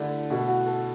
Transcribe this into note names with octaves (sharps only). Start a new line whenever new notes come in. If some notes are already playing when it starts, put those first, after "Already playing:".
Already playing: D3 A3 D4 E4
B2 A3 E4
F#4
A4